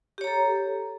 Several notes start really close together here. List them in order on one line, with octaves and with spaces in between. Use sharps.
G4 C#5 A#5 A4